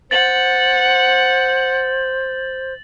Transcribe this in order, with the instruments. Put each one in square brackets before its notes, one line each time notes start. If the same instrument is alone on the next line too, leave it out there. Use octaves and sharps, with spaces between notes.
[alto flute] C5 [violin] F#5 [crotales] A6 F#7